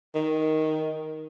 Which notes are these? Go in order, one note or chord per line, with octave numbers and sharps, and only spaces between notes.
D#3